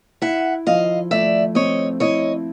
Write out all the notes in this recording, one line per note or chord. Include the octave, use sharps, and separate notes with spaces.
E4 E5 F#5
F3 D#5 F5
A3 D5 E5
C4 C#5 D#5
E4 C#5 D#5